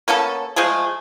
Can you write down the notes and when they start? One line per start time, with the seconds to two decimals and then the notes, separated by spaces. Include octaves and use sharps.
0.08 A#3 B3 C#4 A4
0.56 F3 G#3 A3 G#4